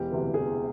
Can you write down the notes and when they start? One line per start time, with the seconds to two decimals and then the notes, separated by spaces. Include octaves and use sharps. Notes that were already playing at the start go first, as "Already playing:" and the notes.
Already playing: E1 G4
0.11 D2 C3 E3
0.34 E1 G#4